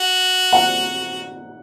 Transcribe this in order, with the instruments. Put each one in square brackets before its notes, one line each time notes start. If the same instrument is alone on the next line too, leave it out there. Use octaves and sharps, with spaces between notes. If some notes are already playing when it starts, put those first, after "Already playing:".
Already playing: [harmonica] F#4
[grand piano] F#5